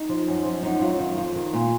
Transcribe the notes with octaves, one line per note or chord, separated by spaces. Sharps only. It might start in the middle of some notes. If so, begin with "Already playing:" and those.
Already playing: D#4
F3
F#2
F3
F#2 D#4
F#3 F4
D#3
F2 F4
D#3
A#2 F4